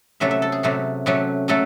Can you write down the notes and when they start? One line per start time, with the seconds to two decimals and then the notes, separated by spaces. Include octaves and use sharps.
0.20 C3 F#3 A3 C#4 E5
0.31 E5
0.42 A4
0.52 G#4
0.63 C3 F#3 A3 C#4
1.06 C3 F#3 A3 C#4
1.48 F#3 A3 C#4 A4